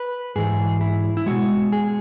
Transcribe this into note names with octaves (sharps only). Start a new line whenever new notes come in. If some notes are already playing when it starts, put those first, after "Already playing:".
Already playing: B4
G#2 E3 G#3 G#4
E4
E4
B2 G#3 F#4
G#4